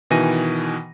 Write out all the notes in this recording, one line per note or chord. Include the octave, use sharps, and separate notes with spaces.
B2 D#3 E3 G#5 A#6 D#7